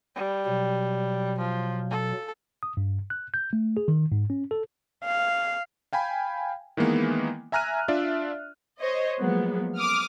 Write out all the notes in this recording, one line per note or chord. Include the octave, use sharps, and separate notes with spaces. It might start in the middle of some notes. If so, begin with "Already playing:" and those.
G3
B2 F#3
F3
A4
D#6
G2
F#6
G6
A3
G#4
D#3
G#2
C#4
A4
F5
F5 G5 G#5 B5
D#3 E3 G#3 A#3 B3
E5 G#5 A#5 F6 F#6 D#7
D4 F4 D5 E5
C5 C#5 D#5
F3 F#3 G#3 A#3 B3
D6 D#6 F6